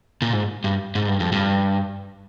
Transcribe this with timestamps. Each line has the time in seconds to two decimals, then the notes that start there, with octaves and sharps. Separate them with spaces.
0.22 A#2
0.33 G#2
0.64 G2
0.95 G#2
1.08 G2
1.20 F2
1.32 G2